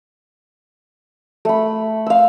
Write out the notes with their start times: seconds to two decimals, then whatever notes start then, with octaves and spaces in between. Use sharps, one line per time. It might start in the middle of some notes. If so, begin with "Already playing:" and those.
1.45 A3 B5
2.06 F5 E6